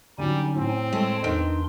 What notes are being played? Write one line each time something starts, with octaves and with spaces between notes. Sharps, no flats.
D3 F#3 G3 C#4 D#4 G#5
A2 C4
G#3 A3 G5 A5
E2 D#3 D4 B4 G5 C6 D7